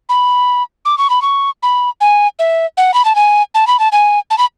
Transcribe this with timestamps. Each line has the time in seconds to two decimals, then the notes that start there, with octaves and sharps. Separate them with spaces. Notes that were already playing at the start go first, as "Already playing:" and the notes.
0.09 B5
0.85 D6
0.98 C#6
1.10 B5
1.22 C#6
1.63 B5
2.01 G#5
2.39 E5
2.77 F#5
2.94 B5
3.05 A5
3.15 G#5
3.55 A5
3.67 B5
3.79 A5
3.92 G#5
4.30 A5
4.38 B5